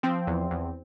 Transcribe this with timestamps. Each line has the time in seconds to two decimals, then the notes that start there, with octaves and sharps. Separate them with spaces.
0.03 F3 C4
0.27 E2
0.51 E2